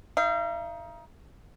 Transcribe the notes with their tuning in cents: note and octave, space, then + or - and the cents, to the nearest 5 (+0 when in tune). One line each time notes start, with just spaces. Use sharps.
D#4 +20 F5 -40